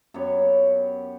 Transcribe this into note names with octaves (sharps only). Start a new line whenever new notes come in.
F#2 B3 G4 C#5